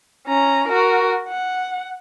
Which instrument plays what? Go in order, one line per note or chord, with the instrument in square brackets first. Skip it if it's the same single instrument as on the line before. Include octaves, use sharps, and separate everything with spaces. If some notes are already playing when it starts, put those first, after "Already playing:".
[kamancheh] C#4 A#5
F#4 A#4
F#5